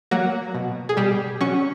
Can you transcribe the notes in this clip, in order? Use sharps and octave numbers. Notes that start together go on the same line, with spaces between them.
F#3 A#3 F#4
B2
G#4
B2 G3 G4
F#3 C#4 C#5